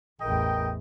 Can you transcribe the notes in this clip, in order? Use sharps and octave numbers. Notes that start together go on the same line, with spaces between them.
A1 E2 A#4 D#5 G5